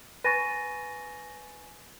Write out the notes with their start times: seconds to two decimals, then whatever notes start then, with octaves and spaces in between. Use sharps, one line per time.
0.24 B4 G#5 C#6 A6 A#6 D#7